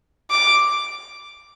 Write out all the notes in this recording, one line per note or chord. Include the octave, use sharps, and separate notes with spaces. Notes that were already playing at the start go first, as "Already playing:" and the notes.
D6